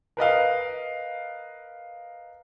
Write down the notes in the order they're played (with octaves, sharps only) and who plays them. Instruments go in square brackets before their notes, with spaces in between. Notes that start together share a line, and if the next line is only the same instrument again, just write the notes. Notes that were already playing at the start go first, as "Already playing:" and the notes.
[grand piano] A#4 B4 D#5 F5